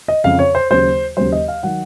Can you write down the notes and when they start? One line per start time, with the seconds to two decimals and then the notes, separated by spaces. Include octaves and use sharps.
0.08 D#5
0.24 F2 C#3 F3 F5
0.39 C#5
0.55 C5
0.71 D#2 C#3 F#3 C5
1.17 D#2 C#3 F#3 C5
1.32 D#5
1.48 F5
1.63 D#3 F#3 F#5